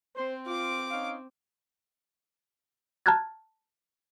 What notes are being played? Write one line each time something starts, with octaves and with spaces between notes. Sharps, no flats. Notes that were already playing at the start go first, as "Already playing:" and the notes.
C4 C5
F4 D6 D7
C#4 D#4 F5
A5 A#5 F6 F#6 G#6 A6